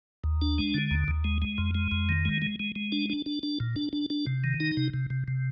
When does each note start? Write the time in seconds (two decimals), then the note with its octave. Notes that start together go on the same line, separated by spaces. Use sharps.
0.24 D#2
0.42 D4
0.58 G#3
0.74 D3
0.91 D#2
1.08 D#2
1.24 G#3
1.42 G#3
1.58 F2
1.75 G#3
1.91 F2
2.09 D#3
2.25 G#3
2.42 G#3
2.60 G#3
2.76 G#3
2.92 D4
3.10 D4
3.26 D4
3.43 D4
3.60 A#2
3.76 D4
3.93 D4
4.10 D4
4.27 C3
4.44 D#3
4.60 D#4
4.77 C3
4.94 C3
5.10 C3
5.28 C3